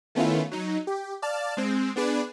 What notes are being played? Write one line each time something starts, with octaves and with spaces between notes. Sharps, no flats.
D#3 A3 B3 C#4 E4 F4
F#3 D#4
G4
D5 F5 A5 F6 A6
G#3 C4
B3 D4 G#4 B4 D5